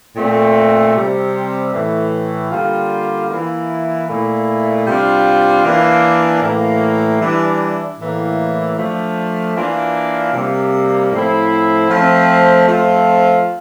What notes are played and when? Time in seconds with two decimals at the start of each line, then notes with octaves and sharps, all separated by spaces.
0.16 A#2 A3 C4
0.94 C3 G3 C4
1.73 A2 E3 A3
2.51 D3 G3 A#3 F4
3.29 E3 A#3 E4
4.08 A#2 A3 E4
4.87 C3 G3 D4 F4
5.64 E3 A#3 D4
6.42 A2 E3 A#3
7.21 E3 G3 D4
7.99 A2 E3 A#3
8.77 F3 A3 D4
9.56 E3 A#3 D4 F4
10.33 C3 G3 A#3
11.11 A2 F3 C4 E4
11.90 F3 A3 C4
12.68 F3 A3 C4 F4